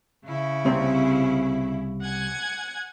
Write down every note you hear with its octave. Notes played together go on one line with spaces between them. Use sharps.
C#3 E4
C2 C3 C4
F#5 G#5 G#6